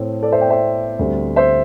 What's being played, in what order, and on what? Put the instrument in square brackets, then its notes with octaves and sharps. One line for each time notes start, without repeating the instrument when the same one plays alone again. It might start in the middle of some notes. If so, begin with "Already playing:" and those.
Already playing: [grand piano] A2 A3 C4
A4 D5
C5 E5
D5 G5
C5 E5
D2 D3 G3 C4
C5 E5